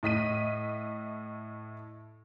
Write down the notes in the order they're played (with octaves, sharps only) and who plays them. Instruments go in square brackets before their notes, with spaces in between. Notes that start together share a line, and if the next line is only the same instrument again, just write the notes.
[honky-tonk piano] A2 D#5 B6 D#7